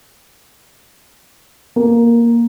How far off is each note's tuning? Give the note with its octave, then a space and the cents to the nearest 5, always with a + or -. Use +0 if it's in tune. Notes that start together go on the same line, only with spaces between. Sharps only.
A#3 +5